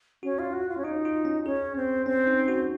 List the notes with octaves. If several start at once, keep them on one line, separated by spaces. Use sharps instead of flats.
C#4 F#4
F4
F#4
F4
C#4
D#4 F4
F4
C#4
C#4 G#4
C4
C4 C#4
D#4
F#4